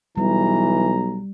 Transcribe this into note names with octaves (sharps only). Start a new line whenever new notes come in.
B1 E3 G3 A#5